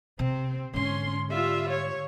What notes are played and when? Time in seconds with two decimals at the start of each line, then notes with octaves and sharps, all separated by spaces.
0.19 C3 C4
0.74 G#2 D3 C#4 C6
1.31 G3 F4 E5
1.70 C#5